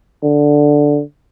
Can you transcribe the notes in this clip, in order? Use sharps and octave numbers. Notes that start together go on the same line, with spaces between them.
D3